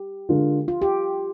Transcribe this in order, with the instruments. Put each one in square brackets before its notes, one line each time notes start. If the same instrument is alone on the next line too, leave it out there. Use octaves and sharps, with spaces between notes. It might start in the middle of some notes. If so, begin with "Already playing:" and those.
Already playing: [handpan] G4
[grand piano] D3 G#3 D4 F4 A#4
[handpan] F4
G4